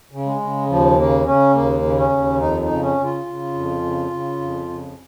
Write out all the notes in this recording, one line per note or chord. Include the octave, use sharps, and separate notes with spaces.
C#3
G#3
C#3
D#2 F3
C#3 A#3
C#3 C#4
D#2 A#3
C#3
C#4
D#2
F2 D#4
D#4
C#3
C#4
C#3
F4
C#3
F2
C#3
C#3
F2
C#3